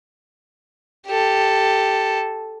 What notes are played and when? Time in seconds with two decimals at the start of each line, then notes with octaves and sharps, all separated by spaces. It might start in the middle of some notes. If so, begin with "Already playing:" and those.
1.07 G4 A4